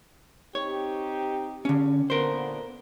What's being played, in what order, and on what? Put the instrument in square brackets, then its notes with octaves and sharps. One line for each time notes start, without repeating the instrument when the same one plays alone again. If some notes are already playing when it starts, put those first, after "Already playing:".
[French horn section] C4 D#4 G4 [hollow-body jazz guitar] C#5
[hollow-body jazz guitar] D3 C#4
[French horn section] A#2 D3 B3 [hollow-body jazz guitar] A#4 C5